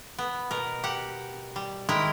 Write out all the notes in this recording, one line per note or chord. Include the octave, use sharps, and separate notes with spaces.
B3
B2 A#4
G4 F#5
G3
D#3 G#3 E4 A#4 G5